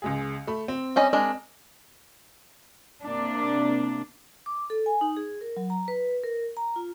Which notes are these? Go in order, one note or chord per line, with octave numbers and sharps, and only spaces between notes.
C#2 G#3 G#4
A3 B5
C4
G3 C#4 D#5
G#3 D4 A#4
C3 A#3 D4
D6
A4
G#5
D#4
G#4
A#4
F#3
A#5
B4
A#4
A#5
F4